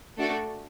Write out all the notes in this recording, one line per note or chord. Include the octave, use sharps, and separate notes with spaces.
A3 D4 F#4 A4